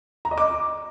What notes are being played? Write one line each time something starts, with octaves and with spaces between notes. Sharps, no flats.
A#5
D#5
D6